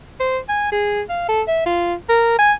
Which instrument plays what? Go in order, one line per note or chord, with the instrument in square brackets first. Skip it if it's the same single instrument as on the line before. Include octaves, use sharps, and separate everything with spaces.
[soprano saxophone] C5
G#5
G#4
F5
A4
E5
F4
A#4
G#5